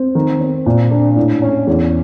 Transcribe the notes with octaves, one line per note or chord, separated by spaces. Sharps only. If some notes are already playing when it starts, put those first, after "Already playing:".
Already playing: C4
D#3
C4
A#2
D4
A2
C#4
E2